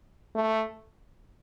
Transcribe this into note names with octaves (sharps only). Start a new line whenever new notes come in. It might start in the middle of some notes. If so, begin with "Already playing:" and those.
A3